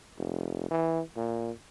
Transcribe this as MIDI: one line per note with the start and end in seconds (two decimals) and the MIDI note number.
0.18 0.70 29
0.71 1.01 52
1.16 1.51 46